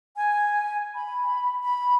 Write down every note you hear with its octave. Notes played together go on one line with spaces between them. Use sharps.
G#5
B5
B5